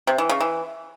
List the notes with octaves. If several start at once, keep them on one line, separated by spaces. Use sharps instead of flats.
C3
E3
C#3
E3